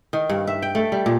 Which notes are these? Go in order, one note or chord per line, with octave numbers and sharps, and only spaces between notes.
D#3
G2
E5
G5
A3
G3
A#2